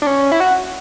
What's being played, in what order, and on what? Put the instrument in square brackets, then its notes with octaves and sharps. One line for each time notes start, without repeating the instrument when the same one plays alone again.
[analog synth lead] D4
C#4
E4
F#4